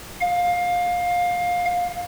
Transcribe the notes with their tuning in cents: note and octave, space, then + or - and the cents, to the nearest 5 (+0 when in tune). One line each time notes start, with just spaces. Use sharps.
F5 +20